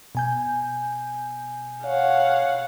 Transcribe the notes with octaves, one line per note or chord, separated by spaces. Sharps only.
B2 G#5 G6
C#5 F5 F#5